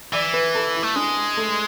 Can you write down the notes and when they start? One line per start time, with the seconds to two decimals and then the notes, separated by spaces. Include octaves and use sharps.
0.13 E3 D5
0.34 B4
0.55 A4
0.75 E4
0.83 A3
0.96 G#3 D4
1.37 A3